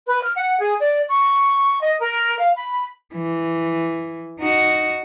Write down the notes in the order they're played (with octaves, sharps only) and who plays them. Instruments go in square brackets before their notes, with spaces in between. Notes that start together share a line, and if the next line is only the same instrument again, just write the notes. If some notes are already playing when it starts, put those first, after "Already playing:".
[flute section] B4
F6
F#5
G#4
D5
C#6
D#5
A#4
F5
B5
[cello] E3
D#4 F#4